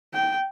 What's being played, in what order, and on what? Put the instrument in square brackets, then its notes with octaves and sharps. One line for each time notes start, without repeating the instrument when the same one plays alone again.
[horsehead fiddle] G5